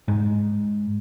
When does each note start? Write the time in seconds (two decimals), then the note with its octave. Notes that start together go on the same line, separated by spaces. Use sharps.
0.08 G#2